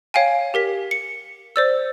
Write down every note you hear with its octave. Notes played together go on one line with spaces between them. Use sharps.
C#5 F5 G5 G#5
G4 A#4 B6
C#7
C5 D5 E6